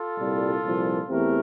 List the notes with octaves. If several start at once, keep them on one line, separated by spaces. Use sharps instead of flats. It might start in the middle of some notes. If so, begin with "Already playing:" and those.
Already playing: F4 A4
C2 A#2 G3
C2 A#2 F3
E2 E3 A3 C4 G4 A#4